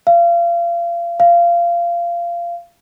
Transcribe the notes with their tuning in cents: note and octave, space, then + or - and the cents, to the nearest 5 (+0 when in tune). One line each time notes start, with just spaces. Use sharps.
F5 -30
F5 -20